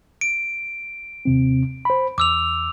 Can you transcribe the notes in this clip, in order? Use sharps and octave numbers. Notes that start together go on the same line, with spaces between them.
D7
D#2 C3 C4
C5 B5
E2 D6 E6 F7